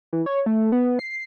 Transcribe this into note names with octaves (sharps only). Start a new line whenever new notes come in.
E3
C#5
A3
B3
C7